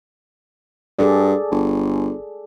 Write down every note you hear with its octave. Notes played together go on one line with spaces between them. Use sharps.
G2 G#4 A4 D5
G1